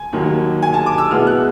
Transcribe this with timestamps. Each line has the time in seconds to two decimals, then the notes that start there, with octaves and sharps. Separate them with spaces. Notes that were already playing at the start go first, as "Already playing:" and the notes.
Already playing: G#5
0.13 D#2 D#3 F#3 A#3
0.63 G#5
0.74 A5
0.86 D6
0.98 E6
1.11 B2 G#3 B3 E4 F6
1.27 F#6